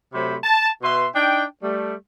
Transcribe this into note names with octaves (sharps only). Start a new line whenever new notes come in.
C3 F#3 A3 C5 B5
A5
B2 B4 E5 C6
D4 D#4 G5
G3 A3